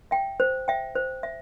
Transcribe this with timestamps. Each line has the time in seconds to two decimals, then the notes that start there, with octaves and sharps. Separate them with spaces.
0.11 E5 G5
0.40 C5
0.68 E5 G5
0.96 C5
1.23 E5